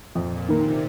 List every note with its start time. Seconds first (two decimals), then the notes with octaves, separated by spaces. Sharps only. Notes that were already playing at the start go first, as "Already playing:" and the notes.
0.15 F2 A#2
0.48 C3 D#3 A#3